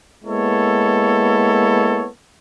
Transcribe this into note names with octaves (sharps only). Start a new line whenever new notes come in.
G#3 A#3 B3 E4 A4 C#5